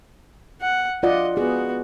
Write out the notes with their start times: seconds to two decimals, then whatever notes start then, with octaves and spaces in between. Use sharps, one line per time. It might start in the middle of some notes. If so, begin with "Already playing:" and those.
0.61 F#5
1.03 F4 D5 D#5 F#5
1.37 B3 F#4 G#4